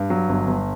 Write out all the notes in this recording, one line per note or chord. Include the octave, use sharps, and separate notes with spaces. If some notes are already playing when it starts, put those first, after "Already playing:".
Already playing: G2
F#3
G1
G1